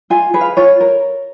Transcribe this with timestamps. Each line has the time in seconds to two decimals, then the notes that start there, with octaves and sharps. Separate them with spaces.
0.10 F4 G#5
0.34 G#4 B4
0.41 F5
0.57 F4 C#5
0.80 A#4